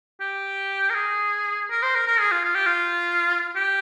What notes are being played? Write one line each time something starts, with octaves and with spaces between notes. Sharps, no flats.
G4
A#4
G#4
A#4
C5
A#4
A#4
G#4
F4
F4
G4
F4
G4